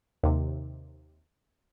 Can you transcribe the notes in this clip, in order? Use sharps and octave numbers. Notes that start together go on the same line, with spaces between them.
D#2 C3